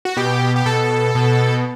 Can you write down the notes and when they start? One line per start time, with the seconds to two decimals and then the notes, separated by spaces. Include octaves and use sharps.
0.05 F#4
0.17 B2 G4
0.56 G4
0.66 B2 A4
1.15 B2